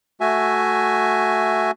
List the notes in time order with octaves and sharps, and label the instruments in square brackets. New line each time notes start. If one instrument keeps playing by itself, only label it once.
[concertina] A3 F#4 E5 G#5